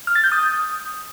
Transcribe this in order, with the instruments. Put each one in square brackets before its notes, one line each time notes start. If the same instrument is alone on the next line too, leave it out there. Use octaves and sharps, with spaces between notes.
[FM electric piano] F6
A6
G6
D#6